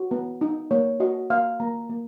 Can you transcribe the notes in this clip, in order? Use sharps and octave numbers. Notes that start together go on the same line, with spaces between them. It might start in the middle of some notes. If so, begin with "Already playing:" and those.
Already playing: F#4
B3
D#4
A#3 C#5
F#4 D#5
A#3 F5
A#3 A#5
A#3